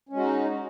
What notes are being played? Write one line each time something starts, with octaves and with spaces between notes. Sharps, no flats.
G#3 C#4 D#4 F#4